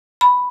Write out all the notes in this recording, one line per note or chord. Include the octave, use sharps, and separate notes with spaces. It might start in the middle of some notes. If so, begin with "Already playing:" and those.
B5